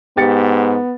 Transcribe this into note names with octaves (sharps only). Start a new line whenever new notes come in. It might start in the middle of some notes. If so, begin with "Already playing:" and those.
G#2 B3 G4 A6 C#7